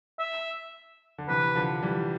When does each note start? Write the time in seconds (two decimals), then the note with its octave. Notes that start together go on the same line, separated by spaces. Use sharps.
0.19 E5
1.18 D3
1.28 C3 E3 B4
1.55 D3 F3
1.82 E3 G3